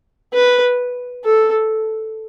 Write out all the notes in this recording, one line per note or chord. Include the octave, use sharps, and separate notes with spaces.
B4
A4